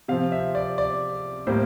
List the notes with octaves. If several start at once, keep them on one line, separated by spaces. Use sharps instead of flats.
C3 F3 C4 F5
E5
D5
D5
A2 G3 A#3 C5